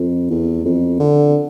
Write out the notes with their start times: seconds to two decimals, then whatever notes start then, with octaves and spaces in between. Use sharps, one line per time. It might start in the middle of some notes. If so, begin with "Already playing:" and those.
Already playing: F2
0.30 E2
0.65 F2
1.00 D3